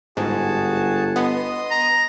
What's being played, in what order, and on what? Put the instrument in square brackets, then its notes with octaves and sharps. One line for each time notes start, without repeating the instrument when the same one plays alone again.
[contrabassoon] G1 [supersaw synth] G#2 [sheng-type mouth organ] F#4 G#4 A5
[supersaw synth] B3 [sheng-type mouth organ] D#5 C6 D#6
[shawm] A#5